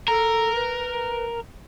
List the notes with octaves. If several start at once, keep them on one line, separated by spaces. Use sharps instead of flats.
A4 A#4
B4